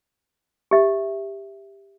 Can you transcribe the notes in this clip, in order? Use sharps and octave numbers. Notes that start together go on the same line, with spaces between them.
G4 E5